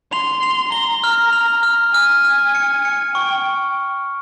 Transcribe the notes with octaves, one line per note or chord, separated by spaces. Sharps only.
C6 F7
F7
A#5 G7
F6
F7
F6
G#5 F6
F6
C#7
C#7
G5 C#6